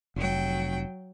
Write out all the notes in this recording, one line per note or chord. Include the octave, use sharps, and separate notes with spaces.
F1 F#3 G5